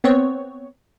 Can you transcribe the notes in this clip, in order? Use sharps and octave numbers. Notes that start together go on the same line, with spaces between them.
B3 C4 C#5